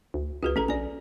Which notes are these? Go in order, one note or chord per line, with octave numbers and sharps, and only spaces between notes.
D2
C#2 F#4 G#4 B4
A1 C#4 A4 A#5
A#1 D5 G#5